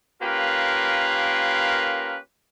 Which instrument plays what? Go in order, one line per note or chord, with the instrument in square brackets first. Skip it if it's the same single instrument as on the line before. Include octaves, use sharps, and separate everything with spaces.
[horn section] A#3 C#4 F4 G4 A#4 B4